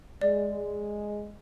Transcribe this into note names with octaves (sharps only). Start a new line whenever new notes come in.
G#3 D5